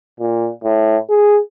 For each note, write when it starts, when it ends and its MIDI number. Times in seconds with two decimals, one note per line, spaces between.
0.20 0.50 46
0.64 0.97 45
1.10 1.40 68